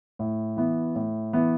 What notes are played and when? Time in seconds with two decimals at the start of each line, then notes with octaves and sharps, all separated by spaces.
0.19 A2
0.57 E3 B3
0.95 A2
1.33 E3 B3